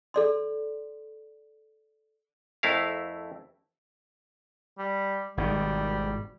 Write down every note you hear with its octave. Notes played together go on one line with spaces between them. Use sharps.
A4 D5 C6
F2 A3 E4 A#4 F5
G3
G#1 B2 D#3 G3